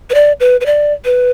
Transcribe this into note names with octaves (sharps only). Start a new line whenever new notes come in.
B4
D5
B4
B4
D5
B4